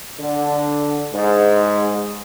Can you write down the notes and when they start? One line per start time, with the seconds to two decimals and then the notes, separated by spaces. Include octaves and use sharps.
0.19 D3
1.12 G#2